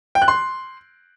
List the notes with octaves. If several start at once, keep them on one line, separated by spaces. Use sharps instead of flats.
G5
F#6
C6